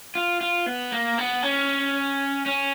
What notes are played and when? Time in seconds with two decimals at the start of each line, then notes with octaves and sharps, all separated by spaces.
0.15 F4
0.41 F4
0.66 B3
0.92 A#3
1.18 B3
1.43 C#4
2.46 C#4